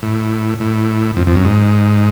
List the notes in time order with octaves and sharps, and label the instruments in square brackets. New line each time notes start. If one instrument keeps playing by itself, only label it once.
[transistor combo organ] A2
A2
F2
F2
F#2
G#2